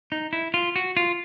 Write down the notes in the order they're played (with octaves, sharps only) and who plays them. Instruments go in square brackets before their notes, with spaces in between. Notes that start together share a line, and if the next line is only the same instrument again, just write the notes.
[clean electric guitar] D#4
E4
F4
F#4
F4